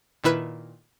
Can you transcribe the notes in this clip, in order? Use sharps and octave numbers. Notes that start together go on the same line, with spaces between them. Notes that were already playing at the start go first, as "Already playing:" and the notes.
A#2 D#3 E4 B4 F#6